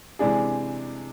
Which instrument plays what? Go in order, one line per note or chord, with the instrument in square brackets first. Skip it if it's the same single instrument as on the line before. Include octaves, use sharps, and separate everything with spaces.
[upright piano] C3 E3 G#3 D4 G#4